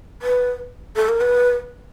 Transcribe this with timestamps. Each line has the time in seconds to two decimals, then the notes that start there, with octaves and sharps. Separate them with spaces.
0.22 B4
0.96 A4
1.09 A#4
1.21 B4